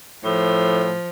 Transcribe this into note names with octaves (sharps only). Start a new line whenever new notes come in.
A2 F3